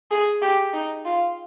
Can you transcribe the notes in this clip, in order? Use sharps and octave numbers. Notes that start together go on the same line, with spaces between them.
G#4
G4
D#4
F4